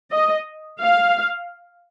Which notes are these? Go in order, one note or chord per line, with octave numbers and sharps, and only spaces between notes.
D#5
F5